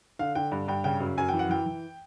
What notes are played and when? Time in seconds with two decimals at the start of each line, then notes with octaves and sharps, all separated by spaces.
0.19 D3 F5
0.35 D3 G5
0.52 G2
0.68 G2 G5
0.84 C#3 G5
1.00 F#2
1.18 F#2 G#5
1.29 E3 G5
1.39 F#5
1.49 E3 G5
1.66 E3